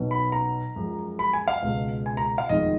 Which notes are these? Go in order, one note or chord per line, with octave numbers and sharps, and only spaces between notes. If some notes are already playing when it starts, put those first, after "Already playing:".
Already playing: B1 B2 F#3 B3
B5
A#5
F#2 F3 G#3
B5
G#5
F5
C#2 B2 G#3
G#5
A#5
F5
F1 F2 D#3 G#3 B3 D#5